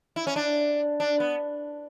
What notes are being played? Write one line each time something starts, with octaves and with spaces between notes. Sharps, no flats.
E4
C#4
D4
D4
B3